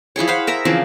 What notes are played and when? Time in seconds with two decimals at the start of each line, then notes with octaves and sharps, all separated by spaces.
0.16 F3 E4 G#4 C#5
0.28 C5 F5 F#5 B5
0.47 A#4 E5 A#5
0.65 C#3 E3 F3 C4